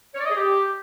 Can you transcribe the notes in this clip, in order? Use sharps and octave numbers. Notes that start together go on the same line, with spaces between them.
C#5
D5
D#5
G#4
G4